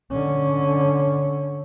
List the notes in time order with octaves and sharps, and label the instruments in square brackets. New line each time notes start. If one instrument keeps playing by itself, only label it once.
[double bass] D3 C#4